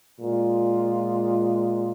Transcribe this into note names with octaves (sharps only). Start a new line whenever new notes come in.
A#2 G#3 F4